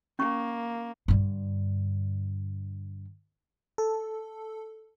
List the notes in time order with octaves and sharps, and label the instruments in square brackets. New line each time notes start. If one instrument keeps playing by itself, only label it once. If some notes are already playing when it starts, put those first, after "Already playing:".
[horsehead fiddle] A#3 [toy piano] C#4 C#6
[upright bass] G2 D3
[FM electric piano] A4